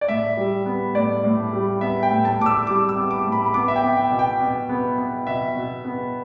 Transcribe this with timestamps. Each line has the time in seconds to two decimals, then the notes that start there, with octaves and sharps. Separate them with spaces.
0.01 D5
0.08 A2 E5
0.37 G3
0.66 B3
0.95 A2 D5
1.24 A2
1.53 G3
1.81 B3 E5
2.03 G5
2.11 A2
2.25 A5
2.38 A2 D6
2.46 E6
2.67 G3 D6
2.89 E6
2.96 B3
3.11 D6
3.26 A2
3.32 B5
3.46 B5
3.54 B3 D6
3.68 E5
3.76 G5
3.83 B3
3.97 G5
4.11 B2
4.19 G5
4.40 B2
4.69 B3
4.98 B3
5.27 B2 E5
5.55 B2
5.84 B3